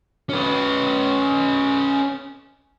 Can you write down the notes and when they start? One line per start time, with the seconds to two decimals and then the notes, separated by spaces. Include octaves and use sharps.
0.30 C#4 B4